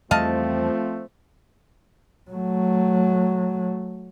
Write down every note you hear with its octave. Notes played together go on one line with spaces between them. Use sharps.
E2 F3 G3 A3 C4 D#5 F5 A5
F#3 A3